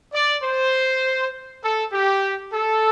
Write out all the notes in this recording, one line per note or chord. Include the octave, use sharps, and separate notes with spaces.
D5
C5
A4
G4
A4